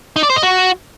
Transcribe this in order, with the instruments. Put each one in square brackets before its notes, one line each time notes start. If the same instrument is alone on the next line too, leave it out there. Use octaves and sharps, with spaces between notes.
[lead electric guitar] D#4
D5
C5
D#5
F#4